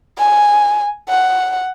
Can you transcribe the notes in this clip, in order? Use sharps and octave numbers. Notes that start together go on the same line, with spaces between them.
G#5
F#5